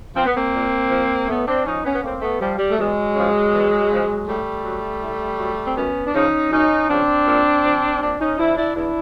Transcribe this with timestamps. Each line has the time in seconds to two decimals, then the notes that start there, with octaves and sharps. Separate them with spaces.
0.16 F3 C4
0.25 B3
0.34 A#3 C4
0.54 A#2
0.91 F3
1.28 A2 A3 B3
1.46 C4 D4
1.65 F3 C#4 D#4
1.84 B3 C#4
1.95 B3
2.03 A2 A#3 C4
2.21 A3 B3
2.40 F3 G3
2.59 G3
2.69 A3
2.77 E2 F#3 G#3
3.15 C#3 F3
3.52 E2
3.90 C#3 F3
4.27 A2 G3 A3
4.65 F#3
5.02 A2
5.39 F#3
5.67 C4
5.76 F#2 B3 C#4
6.06 D4
6.14 C#3 F3 C#4 D#4
6.51 F#2 C#4 D#4
6.88 C#3 F3 C4 D4
7.26 A#2
7.63 F3
8.00 A#2 C4 D4
8.19 C#4 D#4
8.38 F3 D4 E4
8.56 D4 E4
8.75 E2 D4 E4